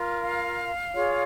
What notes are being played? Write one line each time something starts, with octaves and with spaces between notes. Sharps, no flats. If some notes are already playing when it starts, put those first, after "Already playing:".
Already playing: F4 A#4
F5
F4 G#4 C#5